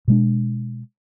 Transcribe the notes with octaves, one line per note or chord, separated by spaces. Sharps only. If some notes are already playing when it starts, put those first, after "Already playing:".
B2 G#3 D4